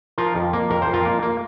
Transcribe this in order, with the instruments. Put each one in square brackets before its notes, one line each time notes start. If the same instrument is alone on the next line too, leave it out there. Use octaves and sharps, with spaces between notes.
[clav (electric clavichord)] F3 F4 A#4
F2
A#3
F2 A#4
C5
F2
F4 A#4
A#3
A#3